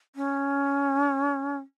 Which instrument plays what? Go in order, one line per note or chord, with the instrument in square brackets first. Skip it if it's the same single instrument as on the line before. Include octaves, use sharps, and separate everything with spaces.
[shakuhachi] C#4